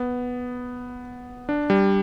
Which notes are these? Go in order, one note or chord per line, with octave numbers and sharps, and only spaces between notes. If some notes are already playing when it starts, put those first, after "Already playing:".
Already playing: B3
D4
G3